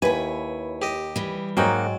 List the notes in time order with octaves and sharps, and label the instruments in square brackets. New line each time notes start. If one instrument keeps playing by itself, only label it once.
[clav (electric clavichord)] D#2 [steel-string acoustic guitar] E4 C#5 [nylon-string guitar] B4 [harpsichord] G#5
[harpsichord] G4 D#5
[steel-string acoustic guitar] E3 G3
[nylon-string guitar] G#2 G5 [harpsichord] F#3 [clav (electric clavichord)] A#3 D#4 F#4